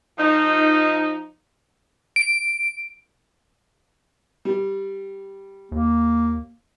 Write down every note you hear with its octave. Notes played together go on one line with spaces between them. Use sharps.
F3 D#4
D7
G3
D#2 A#3